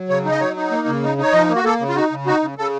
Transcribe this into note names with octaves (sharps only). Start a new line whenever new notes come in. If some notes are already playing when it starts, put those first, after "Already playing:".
Already playing: F#3
C#3 C#5
D#4
D#5
F#3 C#5
D#4
A#3
C#3
D#4
D#4 C#5
F3 D#5
A#3
F#4
A#3 A4
C#3
F4
D#4 F#4
C#3
D#4 F#4
C#3
C#3 A4